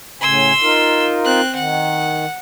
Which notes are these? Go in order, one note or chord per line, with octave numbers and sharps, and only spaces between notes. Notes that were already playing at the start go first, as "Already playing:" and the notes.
A2 C#3 G#5 C6 E6
D#4 F4 A#4
C4 F#6
D#3 F#5